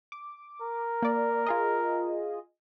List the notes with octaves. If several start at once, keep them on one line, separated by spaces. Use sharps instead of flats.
D6
A#4
A#3 D5
F4 G#4 D#5